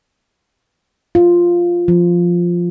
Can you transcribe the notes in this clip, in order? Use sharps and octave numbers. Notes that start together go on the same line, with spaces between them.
F4
F3